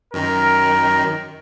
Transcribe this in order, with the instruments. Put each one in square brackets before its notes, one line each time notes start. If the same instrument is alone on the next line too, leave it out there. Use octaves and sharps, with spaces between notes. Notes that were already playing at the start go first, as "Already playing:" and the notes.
[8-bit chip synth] F#2 D#3 [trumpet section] A#4